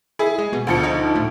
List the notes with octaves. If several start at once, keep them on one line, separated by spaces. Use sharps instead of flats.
E4 G#4
G#3
B2
D2 F3 C#7
D#4
A2